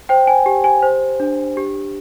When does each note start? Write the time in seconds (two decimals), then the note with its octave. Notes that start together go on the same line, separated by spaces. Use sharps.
0.09 C5 G5
0.27 G#5
0.46 G4
0.64 G#5
0.83 C5
1.20 D4
1.57 G4